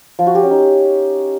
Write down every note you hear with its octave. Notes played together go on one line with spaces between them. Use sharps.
F3
F#4
G4
C#4
D#4